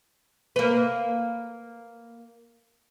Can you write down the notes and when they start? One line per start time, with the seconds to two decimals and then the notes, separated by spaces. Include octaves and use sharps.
0.56 A#3 B4